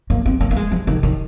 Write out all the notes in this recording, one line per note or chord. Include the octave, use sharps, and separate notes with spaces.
A#3
C4
A#3
A#3
G#3
F3
D#3
D#3